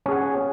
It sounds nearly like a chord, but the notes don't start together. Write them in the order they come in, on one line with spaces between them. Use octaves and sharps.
C#4 G#4 F#5